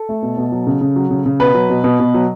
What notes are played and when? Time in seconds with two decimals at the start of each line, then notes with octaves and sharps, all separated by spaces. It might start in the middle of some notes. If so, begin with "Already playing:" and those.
Already playing: A4
0.09 A3
0.23 B2
0.37 B2
0.52 F#3
0.67 C#3
0.81 C#3
0.96 F#3
1.11 C#3
1.26 C#3
1.40 B2 B4
1.55 F#3
1.70 B2
1.84 B2
2.00 B2
2.14 F#3